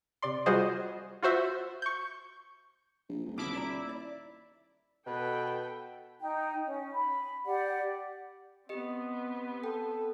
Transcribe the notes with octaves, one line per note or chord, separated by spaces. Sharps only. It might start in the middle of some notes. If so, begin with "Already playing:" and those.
C3 D5 C6
G3 F4 F#4 G#4 C5 D#5
F4 F#4 C5 E5
C#6 G6
A#1
D#1
B2 D3 F#3 E4 D6
A#3 E4 D5 A#5
D5
B2 A4 B4 G5
D#4 G5
C#4
B5
G4 D5 F#5
B3 C4 G4 D#5
A4 G5